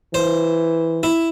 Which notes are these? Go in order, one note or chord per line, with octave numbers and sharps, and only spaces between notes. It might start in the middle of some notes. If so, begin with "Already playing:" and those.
E3 C5
E4